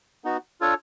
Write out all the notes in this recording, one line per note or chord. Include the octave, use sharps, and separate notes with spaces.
B3 D#4 F#4
D4 F4 A4 C#5